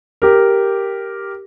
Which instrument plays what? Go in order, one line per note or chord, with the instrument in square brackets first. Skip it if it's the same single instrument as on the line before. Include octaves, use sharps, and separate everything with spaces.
[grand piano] G4 A#4